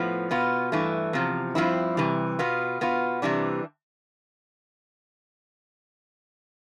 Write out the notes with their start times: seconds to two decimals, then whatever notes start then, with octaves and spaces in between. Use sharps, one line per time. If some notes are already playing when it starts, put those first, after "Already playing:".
Already playing: A2 F3 B3
0.31 B2 B3 F4
0.72 G2 E3 A3
1.13 E2 C3 F3
1.55 G2 F3 C4 E4
1.97 C3 E3 G3
2.39 B2 B3 F4
2.81 B2 B3 F4
3.22 C3 E3 G3 D4